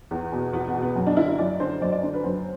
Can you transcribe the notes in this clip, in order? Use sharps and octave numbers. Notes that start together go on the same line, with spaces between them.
E2
B2
E2 B3
B3
B2
B3
F#2
D4
D3 E4
E4
F#2 D5
D3 C5
F#2 D5
D5
D3 C5
B4
F#2 C5